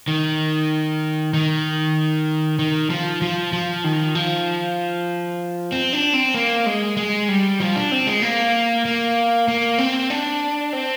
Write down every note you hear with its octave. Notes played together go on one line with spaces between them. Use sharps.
D#3
D#3
D#3
F3
F3
F3
D#3
F3
C4
D4
C4
A#3
G#3
G#3
G3
F3
D4
C4
G#3
A#3
A#3
A#3
C4
D4
C4